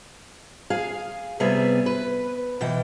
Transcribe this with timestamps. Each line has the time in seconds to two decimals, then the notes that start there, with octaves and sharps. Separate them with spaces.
0.70 G#4 F5
1.40 C3 G3 B3 G#4 E5
1.86 B4
2.61 B2 E3 G5